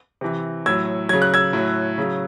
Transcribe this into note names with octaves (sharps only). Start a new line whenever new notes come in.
C3 E3
A2 F#3 E6 G#6
C#3 F#3 G#6
F#6
E6 G#6
A2 F#3
C#3 F#3